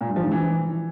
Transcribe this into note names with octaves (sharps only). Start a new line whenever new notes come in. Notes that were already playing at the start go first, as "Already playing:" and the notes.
A#2
G2
F3
D#3
E3